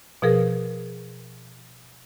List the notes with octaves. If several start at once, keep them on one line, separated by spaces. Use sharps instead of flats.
B2 F3 G#4 A#4